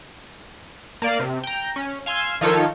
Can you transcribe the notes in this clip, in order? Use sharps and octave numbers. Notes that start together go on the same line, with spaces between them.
A#3 D5 F5
C3
G5 A#5
C#4
F5 G#5 C6 E6 G#6
D#3 F3 D#4 F4 A4 C#5